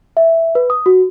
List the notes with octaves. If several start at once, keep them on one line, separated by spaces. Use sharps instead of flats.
E5
B4
D#6
F#4